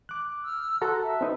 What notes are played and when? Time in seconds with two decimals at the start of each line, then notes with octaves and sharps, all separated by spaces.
0.09 D6 F#6
0.44 E6 F6
0.82 F#4 A4 F#5 A#5 C6 F#6
1.01 E5 A5 E6
1.21 C4 D#4 B4